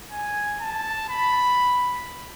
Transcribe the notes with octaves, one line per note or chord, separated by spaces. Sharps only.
G#5
A5
B5